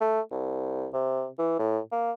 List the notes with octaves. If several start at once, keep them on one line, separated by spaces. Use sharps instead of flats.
A3
C2
C3
E3
A2
A#3